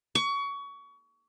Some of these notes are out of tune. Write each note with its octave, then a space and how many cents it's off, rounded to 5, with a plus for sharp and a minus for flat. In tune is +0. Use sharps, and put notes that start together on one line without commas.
C#6 +25